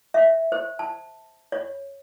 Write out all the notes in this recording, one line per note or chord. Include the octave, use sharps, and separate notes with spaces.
E5
C5
A5
C#5